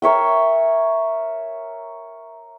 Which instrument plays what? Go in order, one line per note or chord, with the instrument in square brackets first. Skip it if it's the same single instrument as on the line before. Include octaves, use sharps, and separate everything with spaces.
[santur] A#4 C#5 E5 G5